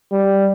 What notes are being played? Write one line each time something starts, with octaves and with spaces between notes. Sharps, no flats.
G3